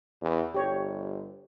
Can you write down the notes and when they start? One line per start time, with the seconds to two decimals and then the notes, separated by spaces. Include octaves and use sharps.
0.21 E2
0.55 G1 G4 C#5